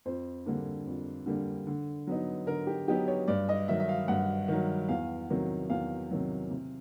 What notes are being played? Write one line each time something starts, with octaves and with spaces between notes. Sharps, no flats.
F2 C5
D3 G3 A#3 D4
F2
D3 G3 A#3 D4
D3
F#3 B3 D#4
D3 A#4
G4
F#3 B3 D#4 G4
C#5
G2 D5
D#5
D#3 F#3 E5
E5
F5
G2 F#5
D#3 F#3
E2 F5
C3 D#3 F#3
E2 F5
C3 D#3 F#3
C3